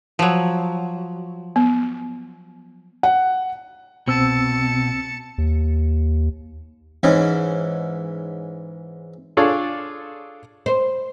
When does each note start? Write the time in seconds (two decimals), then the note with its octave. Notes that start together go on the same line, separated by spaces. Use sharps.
0.19 F3 F#3
1.56 B3
3.03 F#5
4.08 C2 B2 C4 A5 E6 C#7
5.38 D#2
7.03 G#2 E3 C#4
9.37 D4 F4 G#4 A4 C#5 D5
10.66 C5